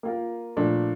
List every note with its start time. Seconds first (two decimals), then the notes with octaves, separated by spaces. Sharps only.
0.03 A#3 F4 A#4
0.56 A#2 F3 A3 D4